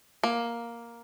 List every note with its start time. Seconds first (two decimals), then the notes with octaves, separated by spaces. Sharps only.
0.23 A#3